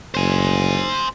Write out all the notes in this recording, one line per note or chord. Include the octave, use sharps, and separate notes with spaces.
F#1 C5 G#5